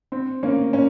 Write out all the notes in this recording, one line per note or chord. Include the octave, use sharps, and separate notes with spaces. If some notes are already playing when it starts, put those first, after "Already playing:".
C4
A#3 C#4
A#3 C#4